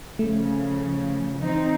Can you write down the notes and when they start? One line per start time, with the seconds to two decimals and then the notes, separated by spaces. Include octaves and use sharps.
0.19 C#3 F3 A3
1.39 E3 C4 D#4